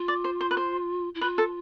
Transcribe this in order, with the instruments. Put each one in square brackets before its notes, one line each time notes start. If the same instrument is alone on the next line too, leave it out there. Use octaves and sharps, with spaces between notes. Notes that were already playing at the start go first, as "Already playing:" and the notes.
Already playing: [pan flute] F4
[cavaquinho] D5
C5
C5
B4
C5
[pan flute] E4
[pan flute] F4 [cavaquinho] B4
[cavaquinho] A4